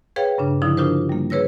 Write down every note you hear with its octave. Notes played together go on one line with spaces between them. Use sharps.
G#4 B4 C#5 F5 G5
G2 C#3 D4
D3 F3 D#4 E4
D4 D#4 F4 G4 A#4 C5
G3 A#3
G#4 B4 C#5 E6 A#6